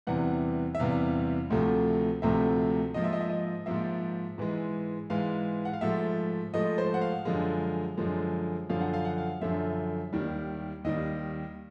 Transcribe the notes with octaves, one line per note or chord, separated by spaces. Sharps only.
E2 C3 E3 G3 F#5
E5
E2 C3 E3 G3 F5
D2 C3 F3 A3
D2 C3 F3 A3 E5
G#2 F3 A#3 D#5
E5
D#5
E5
D#5
G#2 F3 A#3 E5
G#2 E3 G#3
G#2 E3 G#3 F5
F#5
F5
G#2 F3 A3 E5
G#2 F3 A3 D#5
C5
F#5
F5
F#2 D3 F3 G#3
F#2 D3 F3 G#3
F#2 D3 F3 F5
F#5
F5
F#5
F5
F#2 D3 F3 E5
D#2 D#3 G3
D#2 D#3 G3 D#5